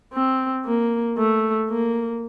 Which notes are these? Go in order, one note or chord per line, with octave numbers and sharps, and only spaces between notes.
C4
A#3
A3
A#3